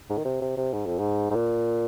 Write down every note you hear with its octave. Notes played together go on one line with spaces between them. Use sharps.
G#2
D#3
C3
C3
C3
G#2
F2
G#2
G#2
A#2